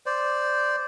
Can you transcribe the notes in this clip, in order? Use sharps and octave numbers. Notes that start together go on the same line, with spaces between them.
C5 D5